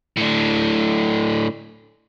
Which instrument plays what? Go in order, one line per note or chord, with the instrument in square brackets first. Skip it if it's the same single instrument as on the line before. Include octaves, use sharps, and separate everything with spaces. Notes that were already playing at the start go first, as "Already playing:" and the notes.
[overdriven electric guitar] A2 D3